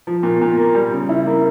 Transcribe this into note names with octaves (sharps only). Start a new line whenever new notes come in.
F3
A#2
A#2
A#3
G3
C#3
E4
A#3